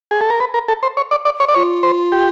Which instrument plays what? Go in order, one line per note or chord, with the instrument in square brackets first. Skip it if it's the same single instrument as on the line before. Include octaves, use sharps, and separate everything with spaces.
[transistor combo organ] G#4
A4
A#4
B4
A#4
A4
C5
C#5
D5
D5
C#5
D5
[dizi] F4 [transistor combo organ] C#5
[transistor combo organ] C5
G4